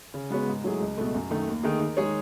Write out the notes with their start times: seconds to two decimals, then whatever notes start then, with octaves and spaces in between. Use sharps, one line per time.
0.14 C#3
0.30 G#3 B3 F#4 C#5
0.48 G#2
0.64 F#3 A3 E4 G#4
0.80 C#2
0.98 B2 A3
1.14 F#2
1.30 D#3 A3 D#4
1.47 D#2
1.63 D#3 A3 D#4 G#4
1.80 D#3
1.97 G#3 D#4 G#4 C#5